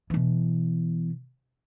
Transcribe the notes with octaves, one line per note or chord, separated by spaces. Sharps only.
B2 E3